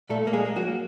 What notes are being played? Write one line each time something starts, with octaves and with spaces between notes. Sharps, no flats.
A#2 A3 A4
A#3
G#3 G#4
A#3
F#3 F#4
A#3